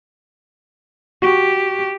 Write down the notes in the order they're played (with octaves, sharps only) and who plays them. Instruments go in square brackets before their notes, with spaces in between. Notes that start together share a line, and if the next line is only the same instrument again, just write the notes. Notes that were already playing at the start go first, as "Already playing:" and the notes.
[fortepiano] F#4 [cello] G4